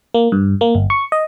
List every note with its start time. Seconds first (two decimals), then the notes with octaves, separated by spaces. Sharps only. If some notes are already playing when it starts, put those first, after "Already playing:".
0.14 A#3
0.32 G2
0.61 A#3
0.75 G1
0.90 C#6
1.12 D#5